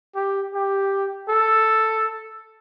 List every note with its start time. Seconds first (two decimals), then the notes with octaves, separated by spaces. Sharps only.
0.15 G4
0.54 G4
1.29 A4